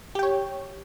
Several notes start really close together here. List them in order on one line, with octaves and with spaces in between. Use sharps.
G4 G5 C#5